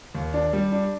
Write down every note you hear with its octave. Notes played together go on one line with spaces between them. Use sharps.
D#2
D4
G3
D4